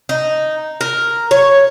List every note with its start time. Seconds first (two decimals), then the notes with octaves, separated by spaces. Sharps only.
0.09 D#4
0.81 A#4
1.31 C#5